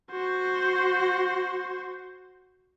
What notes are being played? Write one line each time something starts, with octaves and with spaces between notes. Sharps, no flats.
F#4 C5